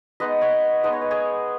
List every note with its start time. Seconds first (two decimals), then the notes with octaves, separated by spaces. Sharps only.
0.20 G#3 B3 D#4 B4 D#5
0.41 C#5 F#5
0.84 G#3 B3 D#4 D#5
0.93 C#5
1.02 B4
1.11 G#4 C#5